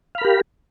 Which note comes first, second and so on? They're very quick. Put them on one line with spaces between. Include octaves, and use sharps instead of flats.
F5 B5 A#4 G4